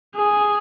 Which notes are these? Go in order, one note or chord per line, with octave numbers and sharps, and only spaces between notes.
G#4